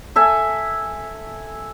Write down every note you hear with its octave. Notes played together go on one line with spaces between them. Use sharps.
A4 E5 G#5